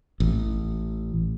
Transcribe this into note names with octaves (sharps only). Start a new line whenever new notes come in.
A1